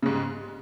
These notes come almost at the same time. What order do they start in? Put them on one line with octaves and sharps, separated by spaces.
C#3 G#2 G3